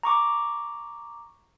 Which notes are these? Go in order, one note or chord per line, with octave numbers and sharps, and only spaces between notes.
A#5 C#6 D6